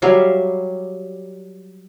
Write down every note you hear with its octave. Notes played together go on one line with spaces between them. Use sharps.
F#3 G3 E5 F5